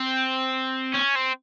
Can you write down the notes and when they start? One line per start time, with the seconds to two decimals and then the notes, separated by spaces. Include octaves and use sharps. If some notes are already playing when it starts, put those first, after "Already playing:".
Already playing: C4
0.94 C#4
1.15 C4